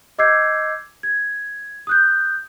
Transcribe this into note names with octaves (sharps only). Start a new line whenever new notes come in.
D#5 D6 E6 G6 G#6 C7
G#6
D#6 F#6 G6